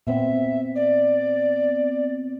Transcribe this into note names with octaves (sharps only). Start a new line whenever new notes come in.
A#2 B3 C4 E5
D5